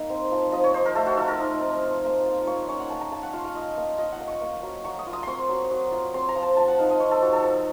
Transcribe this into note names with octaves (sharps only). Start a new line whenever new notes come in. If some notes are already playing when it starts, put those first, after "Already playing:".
Already playing: A#3 D#4 D#5
C4
F3
F3 D#5
C#5
D#4 C5
A#4
A3 A4
F#4
F3 A4
A#4
D#4
C4
F4
A#3
F4
A#3 C#5
C#4 C#5
F#5
A#3 A5
A#5
A#3 A5
F#5
F4 F5
F5
F4 D#5
A#3
F4 D#5
F#5
A#3
C#6
A#3
F#3
F#3 C#6
D#6
F4
D#6
C4 C6 C#6
F#3
F#3
F4
C4 C6
A#5
F3
A5
F3 A5
F#5
D#4 F5
D#5
C4 C#5
A4
F3 F#4
A4
F3 A#4